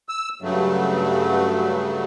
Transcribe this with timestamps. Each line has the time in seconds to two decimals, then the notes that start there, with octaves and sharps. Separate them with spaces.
0.09 E6
0.42 G2 C#3 F#3 A3